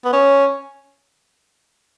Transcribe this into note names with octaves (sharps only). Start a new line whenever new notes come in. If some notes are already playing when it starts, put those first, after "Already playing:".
B3
C#4